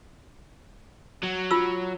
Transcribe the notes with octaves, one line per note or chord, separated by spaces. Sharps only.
F#3
F4 E6